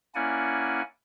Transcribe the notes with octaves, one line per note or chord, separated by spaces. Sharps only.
A#3 C#4 E4 D5 F#5 G#5